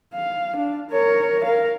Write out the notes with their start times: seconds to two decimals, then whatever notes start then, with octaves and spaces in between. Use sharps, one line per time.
0.14 F5
0.57 D4
0.91 A#4 C#5
1.45 A#4 F5